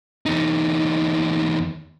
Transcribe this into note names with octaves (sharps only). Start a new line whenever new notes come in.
E2 D#4